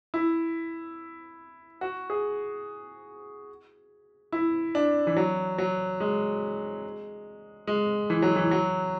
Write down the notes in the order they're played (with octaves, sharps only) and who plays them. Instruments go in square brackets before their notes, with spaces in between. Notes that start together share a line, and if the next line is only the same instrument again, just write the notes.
[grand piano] E4
F#4
G#4
E4
D4
E3
F#3
F#3
G#3
G#3
E3
F#3
E3
F#3